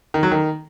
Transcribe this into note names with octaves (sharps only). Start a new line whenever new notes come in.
D#3
F#3
D#3